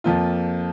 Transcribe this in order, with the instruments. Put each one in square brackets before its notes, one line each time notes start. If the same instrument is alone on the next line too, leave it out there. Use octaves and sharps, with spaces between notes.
[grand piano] F2 F3 A#3 F4